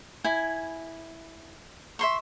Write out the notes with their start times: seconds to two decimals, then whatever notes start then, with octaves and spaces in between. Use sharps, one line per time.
0.24 E4 G#5
1.99 E5 C6 C#6